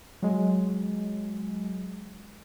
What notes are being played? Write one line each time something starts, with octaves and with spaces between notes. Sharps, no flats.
F#3 G#3